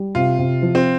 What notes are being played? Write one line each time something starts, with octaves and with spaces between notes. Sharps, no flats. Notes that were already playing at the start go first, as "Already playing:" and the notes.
Already playing: G3
C3 F4
C3
F3
C4